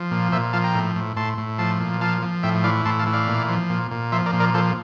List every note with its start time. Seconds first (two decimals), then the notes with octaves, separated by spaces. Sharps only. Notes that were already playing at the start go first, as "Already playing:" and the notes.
Already playing: F3
0.11 A#2
0.32 A#2 C5 E5
0.53 F3 F5 A5
0.64 G5 A#5
0.75 A2
0.96 A2
1.16 A2 A5 C6
1.38 A2
1.59 F3 A5 C6
1.80 A#2
2.01 F3 F5 A5
2.22 F3
2.43 A2 E5 G5
2.64 E3 D5 F5
2.85 A2 A5 C6
2.99 F5 A5
3.06 E3
3.13 D5 F5
3.28 A#2
3.48 F3
3.70 A#2
3.91 A#2
4.12 F3 C5 E5
4.26 A#4 D5
4.33 A#2
4.40 A#4 D5
4.54 F3 A4 C5